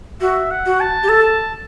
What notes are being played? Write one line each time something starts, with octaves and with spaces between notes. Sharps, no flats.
F#4 E5
F#5
F#4
A5
G4
A4 A5